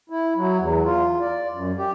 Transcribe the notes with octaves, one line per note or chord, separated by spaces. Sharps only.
E4
F#3
E2
F4
D5
F#2
G4